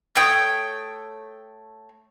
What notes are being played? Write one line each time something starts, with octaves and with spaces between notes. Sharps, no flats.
A3 C#5 G5 D#6